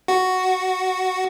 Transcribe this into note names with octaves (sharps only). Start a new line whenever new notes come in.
F#4